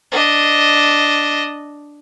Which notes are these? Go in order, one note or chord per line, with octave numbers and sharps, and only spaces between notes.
D4 D#5